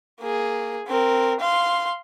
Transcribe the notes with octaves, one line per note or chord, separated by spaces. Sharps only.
A#3 G#4
C4 A#4
F5 C6